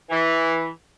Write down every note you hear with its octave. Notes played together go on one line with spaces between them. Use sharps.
E3